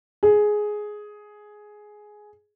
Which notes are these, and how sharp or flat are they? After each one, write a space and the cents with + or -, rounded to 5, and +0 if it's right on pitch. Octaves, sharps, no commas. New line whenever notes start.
G#4 +10